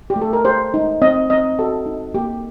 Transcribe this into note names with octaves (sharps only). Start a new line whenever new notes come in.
G4
A3
A4
A#4
G4 C5
D#4
C4 D#5
C4 D#5
F#4 A4
D#4
A#3 G4